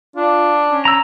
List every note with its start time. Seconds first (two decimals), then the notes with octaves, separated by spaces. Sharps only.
0.16 D4 F4
0.69 C#4
0.85 A#5 E6